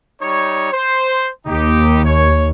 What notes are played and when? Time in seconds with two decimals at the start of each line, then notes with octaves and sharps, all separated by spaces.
0.22 G3 D#4 C#5
0.71 C5
1.47 D#2 D#4 G4
2.04 C#5